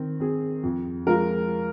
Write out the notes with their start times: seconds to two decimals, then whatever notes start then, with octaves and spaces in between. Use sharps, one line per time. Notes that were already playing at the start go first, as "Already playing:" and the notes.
Already playing: D#3 C4
0.20 C4 G#4
0.63 F2
1.07 F3 G#3 F4 A#4